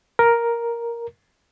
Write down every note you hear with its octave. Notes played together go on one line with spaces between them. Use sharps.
A#4